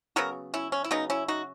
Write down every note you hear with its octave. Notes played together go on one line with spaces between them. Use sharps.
C#3 F#3 B3 F#4 A#4
C#4 E4
C#4
E4
C#3 F#3 B3 D#4
C#4 E4
D#4 F#4